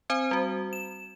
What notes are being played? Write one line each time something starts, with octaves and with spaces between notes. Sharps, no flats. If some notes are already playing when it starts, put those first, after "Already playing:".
C4 C5 G#5
G3 F#4
E7